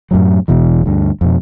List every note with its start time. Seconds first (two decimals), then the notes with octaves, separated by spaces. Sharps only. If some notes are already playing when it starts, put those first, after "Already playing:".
0.11 F#2 A2 F#3
0.48 E1 B2 E3
0.86 D2 G2
1.21 F2 B2